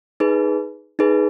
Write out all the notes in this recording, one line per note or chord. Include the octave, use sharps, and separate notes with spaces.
D#4 G#4 B4
D#4 G#4 B4